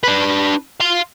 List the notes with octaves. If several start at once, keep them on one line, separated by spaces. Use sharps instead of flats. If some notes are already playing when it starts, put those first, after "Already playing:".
D4 B4
F5 C6